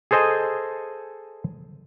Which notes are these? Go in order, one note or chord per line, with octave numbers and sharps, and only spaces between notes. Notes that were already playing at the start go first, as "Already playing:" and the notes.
G#4 A4 C5 D#5 G#5